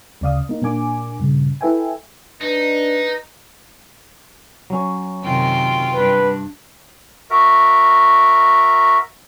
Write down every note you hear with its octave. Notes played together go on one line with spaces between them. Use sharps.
D2 C#3 D5 F5 D#6
A#3 D#4
A#2 A#3 D4 G#5 D6
G2 A#2 C#3
E4 A4 B4 E5 G5 G#5
D4 D#4 B4
F#3 C#4
F#2 C3 D#3 F4 G5
G2 D4 B4
F#4 A#4 E5